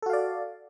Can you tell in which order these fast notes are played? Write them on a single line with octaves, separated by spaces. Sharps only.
A4 F#4 F5 D5